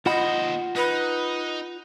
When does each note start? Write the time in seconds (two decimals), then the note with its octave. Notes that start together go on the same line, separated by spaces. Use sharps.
0.06 D#2 F4 C5 D#5 F#5 B5
0.76 D#4 B4